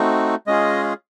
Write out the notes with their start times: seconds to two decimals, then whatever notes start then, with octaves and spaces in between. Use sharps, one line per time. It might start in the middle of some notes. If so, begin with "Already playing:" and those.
Already playing: A3 C4 D#4 F#4
0.47 G#3 C#4 F4 G#4 D#5